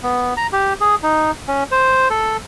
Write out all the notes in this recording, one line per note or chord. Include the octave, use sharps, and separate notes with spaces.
B3
A#5
G4
G#4
D#4
C#4
C5
A4